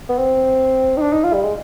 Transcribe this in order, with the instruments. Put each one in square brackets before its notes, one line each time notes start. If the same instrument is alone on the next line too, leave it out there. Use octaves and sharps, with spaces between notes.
[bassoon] B3
C4
D#4
D4
D#4
F4
G3
G#3